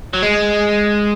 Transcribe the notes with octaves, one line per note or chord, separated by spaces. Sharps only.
F#3
G#3